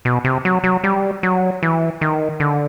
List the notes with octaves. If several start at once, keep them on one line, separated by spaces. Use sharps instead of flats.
B2
C3
F#3
F#3
G3
F#3
E3
D#3
D3